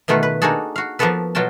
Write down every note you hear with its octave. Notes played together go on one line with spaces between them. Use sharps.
B2 D#3 A3 F4 F#4 B4
B4
A#3 D4 D#4 F#4 G#4 A4
F#4 F5
F3 A#3 B3 F#4 A4 B4
B2 F#3 F4 F#4 G5 A5